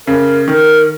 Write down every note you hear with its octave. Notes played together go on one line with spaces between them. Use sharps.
C#3 A#4
D#3 A#4